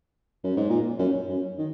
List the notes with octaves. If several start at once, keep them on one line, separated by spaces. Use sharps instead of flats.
F#2
G#2
A#2
F#2
F#2
D#3